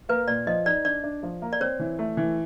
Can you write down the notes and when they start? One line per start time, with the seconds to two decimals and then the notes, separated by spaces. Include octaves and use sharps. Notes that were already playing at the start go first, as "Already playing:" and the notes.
0.09 A#3 B4
0.28 A#2 D5
0.47 F3 D#5
0.66 D#4 D5
0.85 D4 D5
1.04 D4
1.23 F3
1.42 A#3
1.53 D5
1.60 C4 C#5
1.79 E3
1.99 A3
2.17 E3